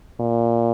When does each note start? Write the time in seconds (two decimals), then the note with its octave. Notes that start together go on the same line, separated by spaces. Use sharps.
0.21 A#2